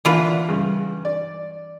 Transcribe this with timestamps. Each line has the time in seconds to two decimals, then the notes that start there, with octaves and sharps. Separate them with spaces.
0.05 A#2 D3 E3 A#3 F4 B4
0.49 G2 C#3
1.05 D5